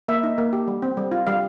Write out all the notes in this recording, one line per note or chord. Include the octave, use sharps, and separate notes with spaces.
A#3 E5
D#4
A#3
G4
G3
C4
G3
F4
G3 F5